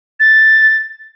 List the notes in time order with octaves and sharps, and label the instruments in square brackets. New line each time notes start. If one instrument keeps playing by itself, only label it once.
[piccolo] A6